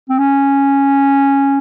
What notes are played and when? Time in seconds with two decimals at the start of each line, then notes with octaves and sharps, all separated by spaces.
0.09 C4
0.19 C#4